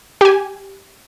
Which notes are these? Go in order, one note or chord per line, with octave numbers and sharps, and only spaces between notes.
G4 G#5